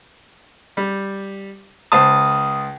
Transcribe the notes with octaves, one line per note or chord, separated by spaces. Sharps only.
G3
C#2 C5 A5 D#6